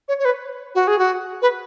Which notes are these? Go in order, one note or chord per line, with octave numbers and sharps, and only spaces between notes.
C#5
C#5
B4
F#4
G#4
F#4
B4